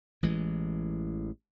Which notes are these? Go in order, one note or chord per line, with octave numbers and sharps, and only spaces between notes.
A1 E3 G#3